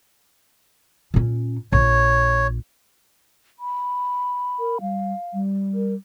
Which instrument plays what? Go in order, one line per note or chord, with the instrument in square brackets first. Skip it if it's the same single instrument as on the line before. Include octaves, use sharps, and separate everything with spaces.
[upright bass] A#2 C#4
[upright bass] A#1 [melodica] C#5
[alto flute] B5
[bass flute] A#4
[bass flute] G3 [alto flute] F5
[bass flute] G3
[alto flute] A#4